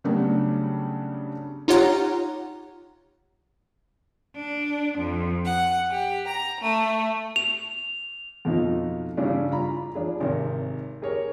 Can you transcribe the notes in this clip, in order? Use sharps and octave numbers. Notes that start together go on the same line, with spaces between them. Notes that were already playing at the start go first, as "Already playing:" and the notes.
C#3 F#3 G3 A3 B3 D4
D#4 F4 G4 C#5 F#5 A#5
D4
F2
F#5
G4
A#5
A3
F7
F2 B2 F3 D#4 F4
G2 C#3 E3 G3 D4
F4 A#5 B5
F3 D4 G#4
G#1 C3 A#4
G4 G#4 A#4 C#5